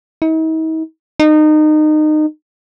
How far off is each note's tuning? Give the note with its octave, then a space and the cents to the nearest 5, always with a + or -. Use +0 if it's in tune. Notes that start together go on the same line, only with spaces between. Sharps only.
D#4 +45
D#4 -25